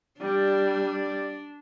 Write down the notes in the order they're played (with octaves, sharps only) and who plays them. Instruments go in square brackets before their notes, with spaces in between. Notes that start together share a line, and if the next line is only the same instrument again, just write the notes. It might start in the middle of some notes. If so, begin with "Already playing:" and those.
[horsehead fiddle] G3 [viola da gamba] D4 [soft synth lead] D5